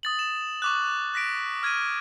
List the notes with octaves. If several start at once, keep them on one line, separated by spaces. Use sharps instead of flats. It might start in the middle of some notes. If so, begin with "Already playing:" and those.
D#6 A6 F#7
E7
C#6 D6 F#6
F#6 A#6 B6 D7
F6 G#6 A#6 D#7